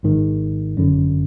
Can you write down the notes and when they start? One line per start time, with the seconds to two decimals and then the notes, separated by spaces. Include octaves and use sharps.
0.03 G#1 G#2 D#3
0.77 G1 F#2 D3